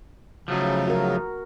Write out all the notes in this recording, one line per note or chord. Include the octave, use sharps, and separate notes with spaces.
C#3 F3 F#3 A3 D#4
F#4 A#4